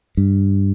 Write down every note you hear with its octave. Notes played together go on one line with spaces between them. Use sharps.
G2